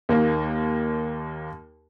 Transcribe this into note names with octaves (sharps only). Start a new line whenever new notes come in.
D#2 A#3